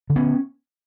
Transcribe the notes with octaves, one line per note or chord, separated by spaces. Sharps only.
D3
B3 C#4